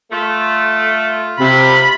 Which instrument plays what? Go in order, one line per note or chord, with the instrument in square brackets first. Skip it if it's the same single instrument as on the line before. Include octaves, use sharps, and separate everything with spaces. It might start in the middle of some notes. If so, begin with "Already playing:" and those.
[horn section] A3 [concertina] F4
[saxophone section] C3 [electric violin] B5